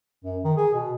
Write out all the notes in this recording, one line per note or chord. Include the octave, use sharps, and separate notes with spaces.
F#2
D#3
G#4
B2